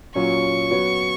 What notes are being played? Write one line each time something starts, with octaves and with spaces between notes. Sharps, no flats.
A#2 F#3 C#4 C#6
F#3 B3 F#4 C#5